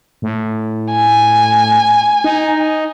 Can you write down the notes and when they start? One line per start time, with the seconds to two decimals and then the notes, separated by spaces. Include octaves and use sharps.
0.22 A2
0.92 G#5
2.24 D#4